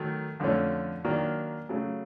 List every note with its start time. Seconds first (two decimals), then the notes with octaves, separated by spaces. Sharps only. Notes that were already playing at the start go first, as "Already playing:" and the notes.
Already playing: D#3 F#3 A3
0.40 F2 D3 F3 A3 C#4
1.04 D#3 F#3 A#3 D4
1.69 C#3 F#3 A3